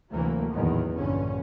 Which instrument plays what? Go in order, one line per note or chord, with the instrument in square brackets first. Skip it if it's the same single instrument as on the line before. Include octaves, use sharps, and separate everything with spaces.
[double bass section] D2 C3 E3 F#3 A3 A#3
A1 E2 A#2 D#3 F#3
A#1 G2 D3 C#4